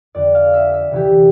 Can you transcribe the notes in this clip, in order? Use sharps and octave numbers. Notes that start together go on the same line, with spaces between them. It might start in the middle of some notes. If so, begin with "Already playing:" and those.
F2 D3 D5
F5
E5
E5
D2 C3 E3 G4